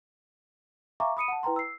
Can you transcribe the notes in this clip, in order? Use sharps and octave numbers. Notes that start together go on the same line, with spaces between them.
E5 F5 G#5 A#5 C#6 D6
B5 D#6 C#7 D#7
F#5 A5
E4 B4 G5 A#5 C6
E6 C7